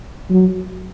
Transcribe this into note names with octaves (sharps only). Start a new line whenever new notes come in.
F#3